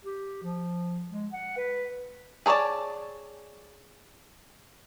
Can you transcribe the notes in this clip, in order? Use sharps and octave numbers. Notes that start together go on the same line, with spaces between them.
G4
F3
G#3
F#5
B4
G#4 A4 C#5 D5 A5